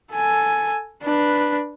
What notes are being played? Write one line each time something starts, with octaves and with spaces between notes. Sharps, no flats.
A4 G#5
D4 B4